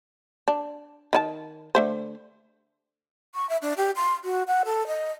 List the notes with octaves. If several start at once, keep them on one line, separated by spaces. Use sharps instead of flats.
D4
D#3 E4 A5
D3 A3 C5
C#6
E5
D4
G4
C6
F#4
F#5
A4
D#5